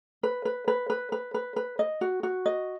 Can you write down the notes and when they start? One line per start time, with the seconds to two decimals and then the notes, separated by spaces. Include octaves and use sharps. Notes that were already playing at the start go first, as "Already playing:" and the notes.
0.23 B4
0.45 B4
0.68 B4
0.90 B4
1.12 B4
1.34 B4
1.56 B4
1.79 D#5
2.01 F#4
2.23 F#4
2.46 D#5